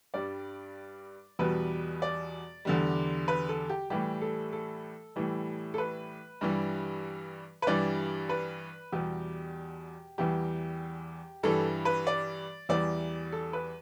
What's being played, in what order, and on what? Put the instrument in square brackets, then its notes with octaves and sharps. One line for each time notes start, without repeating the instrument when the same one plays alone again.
[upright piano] G2 G3 D5
E2 B2 G3 B4
D5
E2 D3 G3
B4
A4
G4
A2 E3 G3 G4
A4
A4
A2 E3 G3
A4
B4
G2 E3 G3
B4
G2 E3 G3 D5
B4
E2 B2 G3 G4
E2 E3 G3 G4
G2 E3 G3 A4
B4
D5
E2 E3 G3 D5
A4
B4